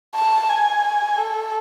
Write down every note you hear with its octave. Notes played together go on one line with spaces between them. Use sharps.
A5
G#5
A4